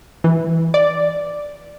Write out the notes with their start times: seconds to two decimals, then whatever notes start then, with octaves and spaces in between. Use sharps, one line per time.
0.24 E3
0.74 D5